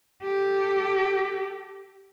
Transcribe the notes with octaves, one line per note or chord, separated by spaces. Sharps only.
G4 A4